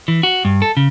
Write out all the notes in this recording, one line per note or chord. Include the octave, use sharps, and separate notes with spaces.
E3
F#4
G2
A4
C#3